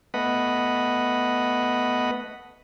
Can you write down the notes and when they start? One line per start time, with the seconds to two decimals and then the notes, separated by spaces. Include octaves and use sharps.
0.14 A3 B3 B4 D#5 F#5